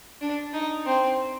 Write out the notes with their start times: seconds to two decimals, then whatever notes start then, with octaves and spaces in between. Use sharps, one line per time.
0.21 D4
0.53 D#4
0.86 C4